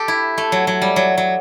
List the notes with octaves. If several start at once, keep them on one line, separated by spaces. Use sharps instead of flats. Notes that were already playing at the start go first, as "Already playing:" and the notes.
Already playing: G4 A4
E4
A3
F#3
F#3
G3
F#3
F#3